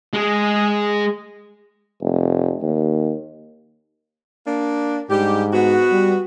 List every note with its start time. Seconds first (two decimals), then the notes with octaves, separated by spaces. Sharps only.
0.13 G#3 G#4
2.01 F1
2.62 D#2
4.46 A#3 D4
5.10 G#2 G3 D4 G4
5.53 B3 F#4
5.91 G3